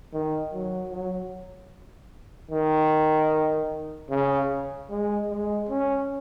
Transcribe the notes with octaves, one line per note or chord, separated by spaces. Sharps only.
D#3
F#3
F#3
D#3
C#3
G#3
G#3
C#4